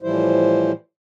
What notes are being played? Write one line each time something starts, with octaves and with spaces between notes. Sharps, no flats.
A2 E3 F3 G3 E4 C5